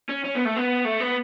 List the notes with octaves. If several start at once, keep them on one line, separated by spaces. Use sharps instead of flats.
C#4
C#4
B3
A3
B3
A3
B3